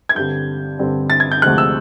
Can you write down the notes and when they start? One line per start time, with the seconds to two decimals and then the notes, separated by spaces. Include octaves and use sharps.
0.09 G#6
0.15 G2 D3 G3 C4 G6
0.79 G2 D3 G3 C4
1.10 A6
1.20 G#6
1.32 G6
1.42 D2 C3 F3 G#3 F#6
1.58 E6